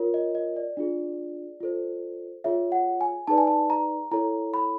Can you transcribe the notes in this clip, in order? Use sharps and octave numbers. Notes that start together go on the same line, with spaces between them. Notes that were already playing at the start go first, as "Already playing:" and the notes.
Already playing: F4 A#4 C#5
D#5
D#5
D5
D4 F4 G#4
F4 A4 C5
F4 G#4 C#5 E5
F#5
G#5
D#4 G#4 B4 D5 A5
G#5
A5
A#5
E4 A4 C#5 A#5
B5